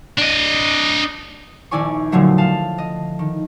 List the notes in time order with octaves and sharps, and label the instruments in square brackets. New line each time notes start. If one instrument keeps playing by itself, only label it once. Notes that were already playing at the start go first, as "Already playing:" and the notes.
[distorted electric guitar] D4 D#5
[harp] A#1 D#3 E4 D5 G#5 C#6
A#2 D3 F3 F#3 A3 F4
F5 A5
D#5
D#3